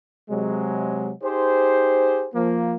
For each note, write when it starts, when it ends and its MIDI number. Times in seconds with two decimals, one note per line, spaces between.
0.29 1.12 48
0.29 1.12 54
0.29 1.12 56
1.23 2.28 63
1.23 2.28 67
1.23 2.28 68
1.23 2.28 72
2.34 2.76 53
2.34 2.76 58